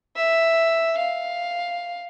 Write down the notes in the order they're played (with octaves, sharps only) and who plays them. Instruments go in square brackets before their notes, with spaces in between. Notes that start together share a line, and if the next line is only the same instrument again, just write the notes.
[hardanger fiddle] E5
F5